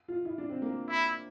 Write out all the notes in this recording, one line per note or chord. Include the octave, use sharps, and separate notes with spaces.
F4
E4
D4
C4
A#3
E4